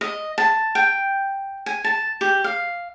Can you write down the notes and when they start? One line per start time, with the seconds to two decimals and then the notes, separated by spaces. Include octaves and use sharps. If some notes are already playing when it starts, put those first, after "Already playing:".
0.01 D#5
0.38 A5
0.75 G5
1.66 G#5
1.84 A5
2.21 G4
2.44 F5